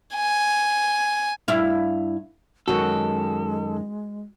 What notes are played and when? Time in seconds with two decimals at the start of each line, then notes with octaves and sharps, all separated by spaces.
0.15 G#5
1.48 G2 E4 F5
2.68 F#2 D#3 G#3 F#4 A4